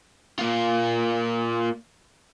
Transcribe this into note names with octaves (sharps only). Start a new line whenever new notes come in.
A#3 F4